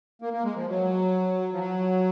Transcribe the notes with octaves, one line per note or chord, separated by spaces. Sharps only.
A#3
A#3
G#3
F3
F#3
F3
F#3